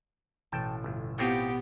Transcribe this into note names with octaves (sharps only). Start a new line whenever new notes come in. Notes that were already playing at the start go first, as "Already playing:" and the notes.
A1 B2 G5 A5
G1
A2 B3 C4 F4 G4